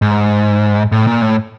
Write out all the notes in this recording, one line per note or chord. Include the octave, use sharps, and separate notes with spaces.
G#2
A2
A#2
A2